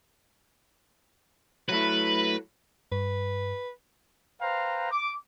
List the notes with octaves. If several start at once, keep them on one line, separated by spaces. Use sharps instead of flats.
F#3 A3 E4 B4
G2 B4
B4 C5 F5 G5 A#5
D6